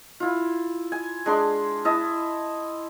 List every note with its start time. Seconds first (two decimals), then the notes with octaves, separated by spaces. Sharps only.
0.20 E4 F4
0.92 G#5
1.26 G#3 D4 C6 D6
1.85 E4 D#5 A5